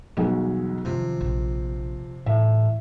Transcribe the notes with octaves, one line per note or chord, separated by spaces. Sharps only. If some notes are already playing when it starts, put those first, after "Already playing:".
B1 E3 F#3 G3 G#4
F#2 C3 D#3 F3
A#1
A2 E3 E5